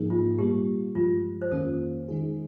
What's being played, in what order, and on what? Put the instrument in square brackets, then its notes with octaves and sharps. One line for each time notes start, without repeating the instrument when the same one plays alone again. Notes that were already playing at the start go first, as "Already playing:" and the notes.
Already playing: [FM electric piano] G#2 F3 A#3 D#4 G#4
[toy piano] F4
[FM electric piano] A#2 G3 A#3 [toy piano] G4
[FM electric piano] G2 F3 G#3 [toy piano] F4
[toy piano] C5
[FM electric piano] F2 D#3 A#3 C#4 F4 [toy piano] A#4
[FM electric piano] D#3 G#3 D#4 G#4